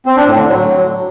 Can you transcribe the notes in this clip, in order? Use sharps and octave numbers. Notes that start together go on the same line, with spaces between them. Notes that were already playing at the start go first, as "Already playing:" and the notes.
C4
D4
A2
D3
F#3